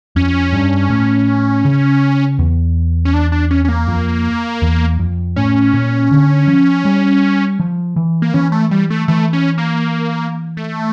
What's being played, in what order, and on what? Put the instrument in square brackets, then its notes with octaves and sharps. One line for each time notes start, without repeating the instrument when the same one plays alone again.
[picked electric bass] F2 [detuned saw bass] C#4
[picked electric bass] G2
A2
C#3
E2
[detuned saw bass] C#4
D4
D4
C#4
C#4
A#3
[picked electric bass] F2
E2
F2
[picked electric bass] A2 [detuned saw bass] C#4
[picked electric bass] A#2
D3
F3
G3
F3
E3
[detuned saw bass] A#3
[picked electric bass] E3 [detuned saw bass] C#4
[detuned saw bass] A3
G3
A3
[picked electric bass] E3 [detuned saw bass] A3
[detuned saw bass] C#4
A#3
A3